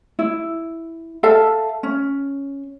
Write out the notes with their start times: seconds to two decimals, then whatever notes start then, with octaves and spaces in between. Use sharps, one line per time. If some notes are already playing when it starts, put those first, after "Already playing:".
0.19 E4
1.23 A4 E5 F5 A5
1.83 C#4